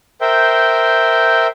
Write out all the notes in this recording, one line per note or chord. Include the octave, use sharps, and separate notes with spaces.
A#4 C5 E5 G5